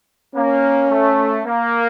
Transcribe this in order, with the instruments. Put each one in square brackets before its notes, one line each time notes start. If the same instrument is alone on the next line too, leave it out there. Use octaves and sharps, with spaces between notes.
[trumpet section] A#3 [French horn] C#4
[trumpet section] A3
A#3